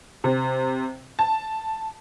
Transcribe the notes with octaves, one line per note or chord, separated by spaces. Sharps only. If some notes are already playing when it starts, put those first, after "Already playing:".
C3
A5